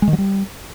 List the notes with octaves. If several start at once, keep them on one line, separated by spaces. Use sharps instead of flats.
G#3
D#3
F#3
G3